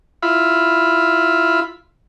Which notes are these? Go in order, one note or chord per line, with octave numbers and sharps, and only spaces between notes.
E4 F4 B5